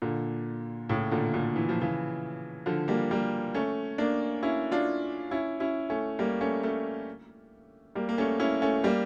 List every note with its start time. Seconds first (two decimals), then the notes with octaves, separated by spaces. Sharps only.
0.02 A#2 D3
0.89 A2 C#3
1.11 A#2 D3
1.34 A#2 D3
1.56 E3
1.69 F3
1.81 C#3 E3
2.66 D3 F3
2.88 G3 A#3
3.11 G3 A#3
3.54 A3 C#4
3.98 A#3 D4
4.43 C#4 E4
4.72 D4 F4
5.31 C#4 E4
5.60 C#4 E4
5.90 A3 C#4
6.19 G3 A#3
6.41 A3 C#4
6.63 A3 C#4
7.95 G3 A#3
8.09 A#3
8.18 A3 C#4
8.40 C#4 E4
8.62 A3 C#4
8.84 G3 A#3